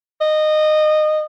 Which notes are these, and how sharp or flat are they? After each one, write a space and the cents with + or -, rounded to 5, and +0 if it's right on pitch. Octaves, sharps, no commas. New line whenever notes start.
D#5 -20